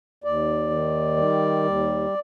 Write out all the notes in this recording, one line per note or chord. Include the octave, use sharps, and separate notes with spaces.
D#2 D5
D#3
G3
D#2